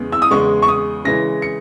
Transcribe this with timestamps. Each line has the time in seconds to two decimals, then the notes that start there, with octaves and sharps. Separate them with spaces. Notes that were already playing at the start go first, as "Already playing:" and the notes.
Already playing: E2 C#3 G#3 B3
0.12 E6
0.22 D#6
0.31 E2 C#3 G#3 B3 C#6
0.62 C#6
0.68 D#6
1.05 C#3 E3 G#3 A#6
1.42 C#7